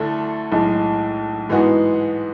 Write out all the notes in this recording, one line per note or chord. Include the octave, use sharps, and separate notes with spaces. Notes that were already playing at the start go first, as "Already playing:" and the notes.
Already playing: D2 D3 A3 E4 A4
B1 A2 G#3
G#2 E3 G#3 B3 F#4